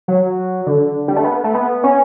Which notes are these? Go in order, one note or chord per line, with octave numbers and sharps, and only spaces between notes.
F#3
D3
G3
A3
B3
A3
B3
C#4